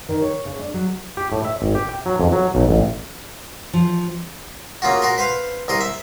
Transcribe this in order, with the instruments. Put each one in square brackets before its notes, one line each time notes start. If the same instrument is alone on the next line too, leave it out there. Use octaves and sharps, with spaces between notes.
[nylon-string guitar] D#3
C#5
C#3
D4
F#3
[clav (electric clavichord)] G4
A2
E5
G#1
G4
G5
F#3
F2
F#3
B1
A1
[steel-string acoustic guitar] F3
[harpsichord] C#3 A#3 F4 F#4
F#4 A#4 C6
B4 C5 F5
C2 A#4 C6 D#6
E5